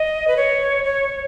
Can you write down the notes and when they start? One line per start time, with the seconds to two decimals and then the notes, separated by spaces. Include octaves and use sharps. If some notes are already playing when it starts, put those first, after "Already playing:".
Already playing: D#5
0.28 B4
0.37 C#5
0.84 C#5